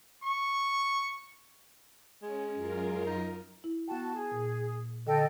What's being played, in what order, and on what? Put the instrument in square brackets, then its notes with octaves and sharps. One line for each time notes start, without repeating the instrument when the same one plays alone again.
[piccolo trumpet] C#6
[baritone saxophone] G#3 [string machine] C#4
[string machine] F#2 F4 A#4
[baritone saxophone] D#4
[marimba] E4
[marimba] B3 G5 [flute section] F#4 A5
[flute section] G#4
[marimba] A#2
[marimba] D3 [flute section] A4 D#5 G5